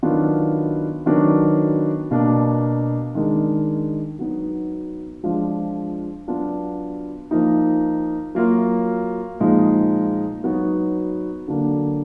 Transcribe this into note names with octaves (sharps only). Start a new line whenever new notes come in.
D#3 F#3 B3 D4 F4
D#3 F#3 B3 D4
B2 A#3 D4
D#3 G#3 D4
F#3 B3 D#4
F3 G#3 D4 F4
F#3 B3 D4 F4
F3 A#3 D#4
F#3 A#3 F4
A#2 F3 G#3 D#4
F#3 B3 D#4
D3 F#3 A#3 D4